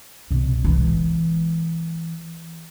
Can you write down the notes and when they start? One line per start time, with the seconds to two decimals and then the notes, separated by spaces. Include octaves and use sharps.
0.31 C2 B2
0.64 E3 G#3